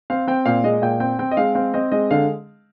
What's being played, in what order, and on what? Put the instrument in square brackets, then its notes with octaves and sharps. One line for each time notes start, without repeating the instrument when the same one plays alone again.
[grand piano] C4 F5
C4 G5
A#2 F5
G#3 D#5
A#2 G5
C4 G5
C4 G5
D#5
G#3 F5
C4 F5
C4 D#5
G#3 D#5
D3 F5